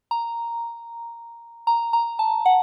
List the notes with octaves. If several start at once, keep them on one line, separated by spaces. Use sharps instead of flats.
A#5
A#5
A#5
A5
F#5